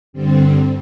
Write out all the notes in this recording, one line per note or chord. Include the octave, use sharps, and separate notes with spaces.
G2 D3 G3 C4